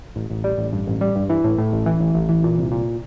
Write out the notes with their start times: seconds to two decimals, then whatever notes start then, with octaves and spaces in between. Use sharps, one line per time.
0.16 A1
0.30 A1
0.44 G3
0.58 A1
0.72 G2
0.87 A1
1.01 G3
1.16 G2
1.30 E3
1.44 A2
1.58 A2
1.72 A1
1.86 E3
2.00 A1
2.15 A1
2.29 E3
2.44 A#2
2.57 C2
2.72 A#2